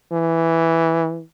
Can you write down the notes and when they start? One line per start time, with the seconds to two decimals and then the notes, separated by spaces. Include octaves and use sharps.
0.12 E3